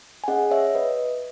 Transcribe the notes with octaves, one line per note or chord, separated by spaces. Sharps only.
G#5
C#4 G#4 D#5 F#5
C#5 E5
B4 D#5